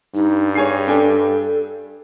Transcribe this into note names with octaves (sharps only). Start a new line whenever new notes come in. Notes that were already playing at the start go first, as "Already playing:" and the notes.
G2 D#4
G#4 C#5 G#5 C7
D4 A4 G5 G#5